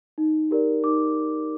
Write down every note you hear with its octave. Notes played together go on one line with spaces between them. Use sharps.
D#4
G4 A#4 D5
D#4 D6